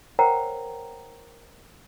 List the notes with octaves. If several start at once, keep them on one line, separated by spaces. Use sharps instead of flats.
A#4 C5 C#5 F#5 G5 A#5